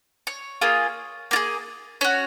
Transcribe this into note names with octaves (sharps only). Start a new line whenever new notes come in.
C#5
A#3 F4 G#4
A#3 F4 G#4
C#4 F#4 C#5